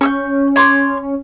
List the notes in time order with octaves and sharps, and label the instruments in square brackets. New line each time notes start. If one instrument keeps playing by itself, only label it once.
[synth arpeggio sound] C#4 [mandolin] C#6 E6 G6
[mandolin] C#5 C6 D6